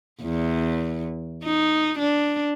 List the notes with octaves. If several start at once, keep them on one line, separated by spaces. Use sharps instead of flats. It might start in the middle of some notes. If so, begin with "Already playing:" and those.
E2
D#4
D4